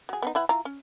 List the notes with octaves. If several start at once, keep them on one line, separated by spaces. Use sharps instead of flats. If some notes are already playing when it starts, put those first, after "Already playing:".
F#3 G#4
B3 C#4 D#4
E3 E4 F#5
E4 F4 A#5
C#4